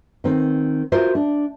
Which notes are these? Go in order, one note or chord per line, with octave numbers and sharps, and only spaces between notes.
D#3 C4
F4 F#4 A#4 C5 E5
D4